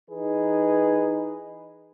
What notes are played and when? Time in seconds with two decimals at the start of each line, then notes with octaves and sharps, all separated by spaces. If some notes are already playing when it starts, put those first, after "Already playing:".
0.10 E3 D#4 G#4 B4